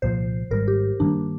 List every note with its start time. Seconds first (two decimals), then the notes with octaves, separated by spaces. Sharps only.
0.02 C2 A#2 F3 C5
0.51 G#1 G#2 G3 A#4
0.68 G4
1.00 G2 D#3 G3 A#3 D4